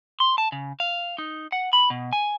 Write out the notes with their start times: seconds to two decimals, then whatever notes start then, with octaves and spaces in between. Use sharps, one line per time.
0.20 C6
0.38 A5
0.52 C#3
0.80 F5
1.18 D#4
1.52 F#5
1.73 B5
1.90 B2
2.13 G#5